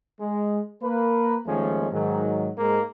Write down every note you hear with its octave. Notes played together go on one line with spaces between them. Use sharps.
G#3
A#3 A#4 B4
D#2 D#3 F3 G#3 A3 C#4
G#2 D#3 F#3
G#2 G#3 A#3